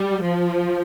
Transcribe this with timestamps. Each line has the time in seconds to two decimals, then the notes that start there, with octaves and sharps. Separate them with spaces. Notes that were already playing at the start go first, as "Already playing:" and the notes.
Already playing: G3
0.23 F3